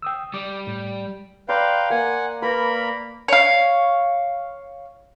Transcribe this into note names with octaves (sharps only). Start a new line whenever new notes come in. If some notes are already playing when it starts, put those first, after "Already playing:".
G5 D#6 E6
G3 D6
A2
B4 D5 F5 G5 A#5 C6
A#3 F#5 G#5
A#3 A#4 B4 B5
C#5 F5